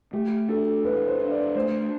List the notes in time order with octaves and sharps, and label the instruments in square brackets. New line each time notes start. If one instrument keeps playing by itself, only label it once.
[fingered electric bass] A3 [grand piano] G4
[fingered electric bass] D4 [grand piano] A4
[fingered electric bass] E2 [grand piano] B4
[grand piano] C5
[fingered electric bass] D4
[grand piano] D5
[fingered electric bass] A3 [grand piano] C5